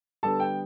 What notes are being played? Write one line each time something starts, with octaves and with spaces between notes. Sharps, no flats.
D3 G3 B3 A4 A5
G5